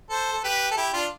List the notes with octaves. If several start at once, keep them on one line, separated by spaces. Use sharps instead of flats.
A4 C5
A4
G4 B4
A4
E4 G4
D4 F4